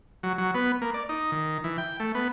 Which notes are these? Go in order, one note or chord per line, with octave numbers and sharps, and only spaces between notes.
F#3
F#3
B3
A#3
D5
D#4
D#3
E3
G5
A3
B3